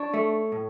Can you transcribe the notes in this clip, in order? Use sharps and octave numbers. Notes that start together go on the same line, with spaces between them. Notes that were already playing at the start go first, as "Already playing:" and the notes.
Already playing: D4 C#5
A3
A2